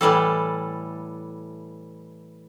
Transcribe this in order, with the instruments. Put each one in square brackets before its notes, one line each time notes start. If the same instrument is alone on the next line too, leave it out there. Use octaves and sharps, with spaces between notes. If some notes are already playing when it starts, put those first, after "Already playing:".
[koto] A2 E3 G3 A4